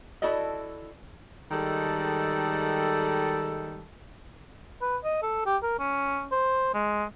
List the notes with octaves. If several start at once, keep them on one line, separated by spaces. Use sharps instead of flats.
E4 F#4 A4 D5 D#5
D#3 G3 G#3 A4
B4
D#5
A4
G4
A#4
C#4
C5
G#3